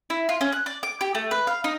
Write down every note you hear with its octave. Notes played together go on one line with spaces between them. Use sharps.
E4
F4
C#4
F#6
D5
D6
G4
A3
B4
F5
D#4